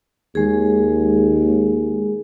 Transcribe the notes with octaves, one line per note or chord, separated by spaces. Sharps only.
D#2 G#3 G#4